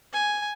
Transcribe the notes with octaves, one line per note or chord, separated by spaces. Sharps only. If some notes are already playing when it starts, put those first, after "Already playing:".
G#5